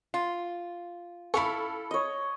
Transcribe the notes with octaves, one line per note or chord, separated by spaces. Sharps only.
F4
E4 A4 F5 B5 C#6
C#5 D#5